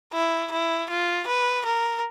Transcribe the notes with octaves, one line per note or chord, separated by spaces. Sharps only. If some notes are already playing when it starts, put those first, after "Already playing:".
E4
E4
F4
B4
A#4